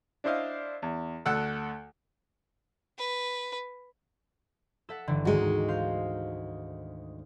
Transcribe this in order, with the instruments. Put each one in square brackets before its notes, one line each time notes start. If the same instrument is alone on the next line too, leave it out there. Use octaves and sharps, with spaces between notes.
[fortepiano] D4 E4 C5 D#5 F5
E2
D2 A4 F#5 E6
[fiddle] B4
[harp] A4 E5 F#5
G1 D3 E3
[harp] D2 G#2 D#3 [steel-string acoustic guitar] G#3 F#4
[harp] C5 F5